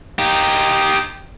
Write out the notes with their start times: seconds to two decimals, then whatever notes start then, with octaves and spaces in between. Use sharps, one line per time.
0.19 D#4 G4